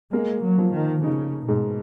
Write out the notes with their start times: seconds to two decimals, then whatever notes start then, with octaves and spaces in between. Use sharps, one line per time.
0.13 G#3 A#3
0.43 F#3
0.58 F3
0.73 D#3
1.04 C#3 D#4
1.48 G#2 B2